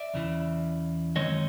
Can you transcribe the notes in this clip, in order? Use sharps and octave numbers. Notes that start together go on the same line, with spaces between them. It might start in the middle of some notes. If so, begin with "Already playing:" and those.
Already playing: D5 E5
E2 C#3 E3
F#2 D#3 G#3 C4 C#5 D#5